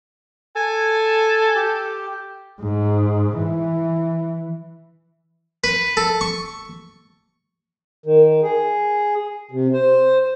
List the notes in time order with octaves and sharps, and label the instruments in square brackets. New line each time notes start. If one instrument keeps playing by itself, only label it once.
[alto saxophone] A4 [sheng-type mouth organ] G#5
[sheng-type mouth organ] G4
[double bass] G#2
E3
[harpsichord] B4
A4
C#6
[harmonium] D#3
G#4
C3
C5